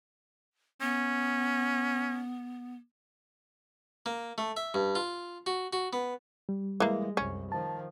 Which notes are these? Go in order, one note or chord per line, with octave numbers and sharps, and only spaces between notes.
B3 C#4
A#3
A3
E5
G2
F4
F#4
F#4
B3
G3
E3 G#3 A#3
C2 F#2 C#4
D#3 F3 A5